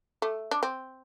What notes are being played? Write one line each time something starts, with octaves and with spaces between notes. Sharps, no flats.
A3
D4
C4